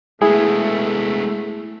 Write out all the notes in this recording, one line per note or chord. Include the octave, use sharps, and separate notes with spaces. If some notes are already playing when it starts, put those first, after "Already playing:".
G#3 A3 B3 E4 G#4